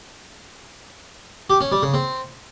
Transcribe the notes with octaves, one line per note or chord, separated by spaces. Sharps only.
G4
C#4
G3
C#3
C4